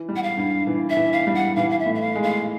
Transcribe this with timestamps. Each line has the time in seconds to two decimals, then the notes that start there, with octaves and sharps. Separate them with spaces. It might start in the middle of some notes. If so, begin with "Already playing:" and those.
Already playing: E3
0.09 G3
0.16 F#5
0.23 F5
0.37 G2
0.67 E3
0.90 E5
0.97 E3
1.13 F5
1.27 G3
1.35 F#5
1.56 E3 F5
1.71 F5
1.79 E5
1.86 A2
1.95 E5
2.01 F5
2.15 G#3
2.23 F5